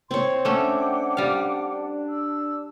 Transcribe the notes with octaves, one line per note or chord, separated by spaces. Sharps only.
C4 C#5 C6
A3 C#4 D4 F#5 G5 D6
G3 F5
E6